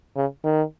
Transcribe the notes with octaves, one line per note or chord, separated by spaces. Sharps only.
C#3
D#3